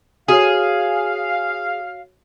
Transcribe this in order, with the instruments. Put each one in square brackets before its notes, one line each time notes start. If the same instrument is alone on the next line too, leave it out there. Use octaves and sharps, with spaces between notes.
[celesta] F#4 C#5 [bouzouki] G#4 [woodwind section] F5